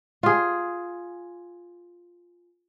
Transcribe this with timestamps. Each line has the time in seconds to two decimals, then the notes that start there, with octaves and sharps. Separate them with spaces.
0.23 F4 G#4